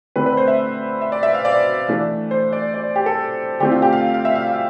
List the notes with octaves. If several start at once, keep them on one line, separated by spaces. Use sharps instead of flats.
D3 A3 C4 B4
B4
C5
E5
E5
D5
E5
F5
D5
E3 A3 D4
C5
D5
D5
G4
A4
D3 A3 C4 G4
F4
G4
F5
F5
E5
F5
F5